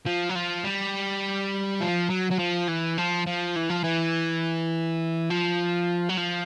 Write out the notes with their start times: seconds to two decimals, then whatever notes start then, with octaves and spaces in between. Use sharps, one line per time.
0.06 F3
0.29 F#3
0.36 F3
0.65 G3
1.81 F3
2.10 F#3
2.31 F#3
2.39 F3
2.68 E3
2.98 F3
3.27 F3
3.56 E3
3.70 F3
3.84 E3
5.30 F3
6.09 F#3
6.18 F3